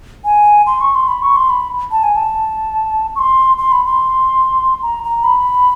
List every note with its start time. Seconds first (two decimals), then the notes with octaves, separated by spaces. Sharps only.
0.25 G#5
0.67 C6
0.81 C#6
0.95 C6
1.08 B5
1.22 C#6
1.36 C6
1.50 B5
1.91 A5
2.03 G#5
2.16 A5
3.16 C#6
3.19 C6
3.58 C6
3.72 B5
3.86 C6
4.83 A#5
5.04 A#5
5.24 B5